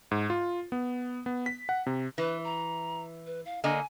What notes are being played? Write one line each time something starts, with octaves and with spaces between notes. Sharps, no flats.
G#2
F4
B3
B3
B6
F#5
C3
E3 B4
A#5
B4
F5
D3 A#3 D#5 G#5